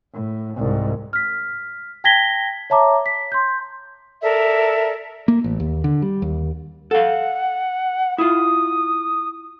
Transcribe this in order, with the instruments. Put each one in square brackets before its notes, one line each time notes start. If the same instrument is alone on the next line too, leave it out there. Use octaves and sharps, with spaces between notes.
[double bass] A2
C2 G#2
[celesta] F6 B6
G5 A5 G#6 A#6 B6 G7
C#5 E5 A5 A#5 D6
B6
C6 G6
[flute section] A4 A#4 D5 E5
[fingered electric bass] A#3
A1
D#2
D3
G3
D#2
[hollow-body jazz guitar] A4 F5 [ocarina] F#5
[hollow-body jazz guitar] E4 F4 [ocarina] D#6